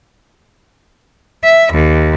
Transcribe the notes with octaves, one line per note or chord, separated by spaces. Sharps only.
E5
D#2